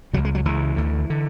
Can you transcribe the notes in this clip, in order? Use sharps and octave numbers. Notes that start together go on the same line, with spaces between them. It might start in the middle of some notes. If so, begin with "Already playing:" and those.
C#2 C#3 F#3
G#3
F#3
C#2 C#3 E3
D2 D3
D3